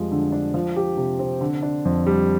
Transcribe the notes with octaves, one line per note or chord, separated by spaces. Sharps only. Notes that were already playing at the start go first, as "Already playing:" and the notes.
Already playing: F2 G3 G#3 F4
D3
D4
F3
G4
C3
C4
D3
D4
F2
G3